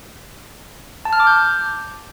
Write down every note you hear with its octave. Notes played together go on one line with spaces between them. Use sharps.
A5
F6
D6
G6